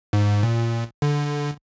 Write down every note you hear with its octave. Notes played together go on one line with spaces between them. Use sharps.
G#2
A#2
D3